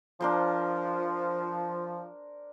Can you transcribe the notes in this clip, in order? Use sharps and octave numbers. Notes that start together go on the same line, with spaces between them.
F3 D4 A#4 C5